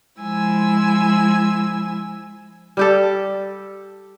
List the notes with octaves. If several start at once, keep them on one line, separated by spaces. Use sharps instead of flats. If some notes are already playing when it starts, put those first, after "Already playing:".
F3 G#3 E4 G#5 E6
G3 G4 A4